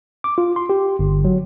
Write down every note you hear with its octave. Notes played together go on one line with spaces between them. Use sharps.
D6
F4
C6
G4
G1
F#3